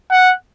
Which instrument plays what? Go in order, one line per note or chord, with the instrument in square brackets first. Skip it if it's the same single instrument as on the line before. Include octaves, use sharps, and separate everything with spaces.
[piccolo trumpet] F#5